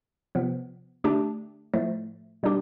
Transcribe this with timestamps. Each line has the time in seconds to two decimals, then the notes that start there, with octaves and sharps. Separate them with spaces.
0.35 C3 F3 B3
1.04 D3 A3 D4 G4
1.74 A2 F3 A3
2.43 B2 G3 D4 G4